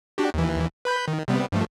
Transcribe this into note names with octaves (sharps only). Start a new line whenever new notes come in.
D4 F#4 G4
D#2 E3
B4 B5 G6
D#3
C3 G3 B3
G2 F3 A3